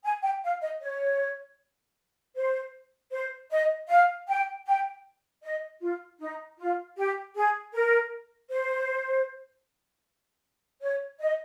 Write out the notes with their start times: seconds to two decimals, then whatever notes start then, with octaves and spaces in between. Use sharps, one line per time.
0.04 G#5
0.23 G5
0.43 F5
0.61 D#5
0.81 C#5
2.35 C5
3.12 C5
3.50 D#5
3.88 F5
4.28 G5
4.66 G5
5.42 D#5
5.80 F4
6.20 D#4
6.58 F4
6.97 G4
7.35 G#4
7.73 A#4
8.50 C5
10.81 C#5
11.19 D#5